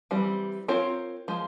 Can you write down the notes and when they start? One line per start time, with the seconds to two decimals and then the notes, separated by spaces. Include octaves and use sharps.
0.11 E3 G3 C4
0.68 C4 F4 A#4 C#5
1.28 F3 G#3